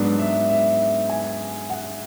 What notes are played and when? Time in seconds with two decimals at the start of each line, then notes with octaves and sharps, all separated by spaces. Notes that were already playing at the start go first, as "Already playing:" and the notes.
Already playing: G#2 F#3 B3 D4
0.19 E5
0.50 E5
1.10 G#5
1.70 F#5